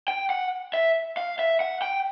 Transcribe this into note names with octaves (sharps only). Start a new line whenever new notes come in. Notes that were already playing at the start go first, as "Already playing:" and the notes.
G5
F#5
E5
F5
E5
F#5
G5